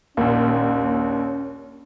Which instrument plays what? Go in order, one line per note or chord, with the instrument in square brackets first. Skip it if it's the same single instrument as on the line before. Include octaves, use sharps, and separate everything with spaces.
[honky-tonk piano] A#1 D#2 [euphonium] C#4